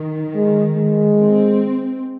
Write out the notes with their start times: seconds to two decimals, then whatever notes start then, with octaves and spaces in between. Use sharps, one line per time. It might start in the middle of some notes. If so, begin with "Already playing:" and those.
Already playing: D#3
0.35 G#3
0.77 G#3
1.19 C4